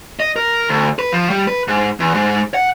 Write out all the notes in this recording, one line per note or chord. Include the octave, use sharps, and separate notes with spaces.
D#5
A#4
D2
B4
F3
G3
B4
G#2
E2
G#2
F#5